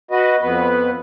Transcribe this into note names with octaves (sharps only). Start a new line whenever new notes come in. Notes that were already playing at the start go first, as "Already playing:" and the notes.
F#4 B4 D#5
F2 B3 B4